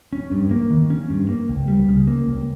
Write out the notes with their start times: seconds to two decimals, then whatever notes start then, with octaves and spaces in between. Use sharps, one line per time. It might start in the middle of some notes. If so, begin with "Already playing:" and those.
0.13 C#4
0.32 G2
0.51 A#3
0.70 D#3
0.90 C#4
1.10 G2
1.29 A#3
1.49 C#2
1.68 G3
1.89 C#3
2.07 A#3
2.27 C#2